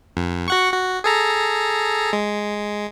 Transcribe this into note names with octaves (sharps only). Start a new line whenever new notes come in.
F2
F#4 F#5 C#6
F#4
G#4 A4 A#5
G#3